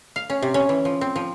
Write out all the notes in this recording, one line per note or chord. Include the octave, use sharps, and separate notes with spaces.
F5
C#4
C3
C#4
E3
F3
C4
F3